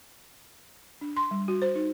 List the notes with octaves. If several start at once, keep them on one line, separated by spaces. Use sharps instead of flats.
D4
C6
G3
F#4
C5
D#4